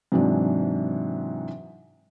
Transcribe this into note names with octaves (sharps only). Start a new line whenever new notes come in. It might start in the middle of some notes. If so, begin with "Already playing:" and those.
G#2 C3 E3 F#3 D4